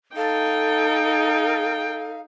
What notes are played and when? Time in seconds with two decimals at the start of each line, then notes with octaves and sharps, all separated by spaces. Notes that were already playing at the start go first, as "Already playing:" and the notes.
0.16 D#4 A4 F5 G5